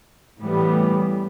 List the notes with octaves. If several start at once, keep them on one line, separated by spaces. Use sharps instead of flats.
A2 E3 G3 B3